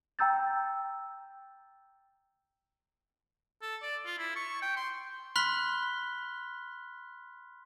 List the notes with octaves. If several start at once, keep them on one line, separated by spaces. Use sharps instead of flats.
G5 A#5 E6 G6 A6
A4
D5
F4
E4
C#6
G5
C6
B5 C6 F6 F#6 B6 G7